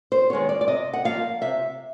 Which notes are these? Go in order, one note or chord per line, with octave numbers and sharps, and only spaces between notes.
C5
D#3 G#3 B3 C#5
D5
D5
C3 D#5
F#5
F3 A#3 F5
C3 E5